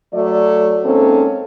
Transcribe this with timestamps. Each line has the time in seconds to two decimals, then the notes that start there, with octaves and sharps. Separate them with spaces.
0.12 F#3 A3 D5
0.84 G#2 A#3 C4 C#4 A4